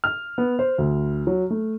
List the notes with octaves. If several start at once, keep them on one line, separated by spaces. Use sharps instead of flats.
F6
B3
C5
D2
F#3
A3